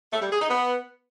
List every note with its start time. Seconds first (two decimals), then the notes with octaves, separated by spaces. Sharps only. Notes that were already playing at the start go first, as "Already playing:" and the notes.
0.13 A3
0.22 G3
0.31 G#4
0.40 D#4
0.49 B3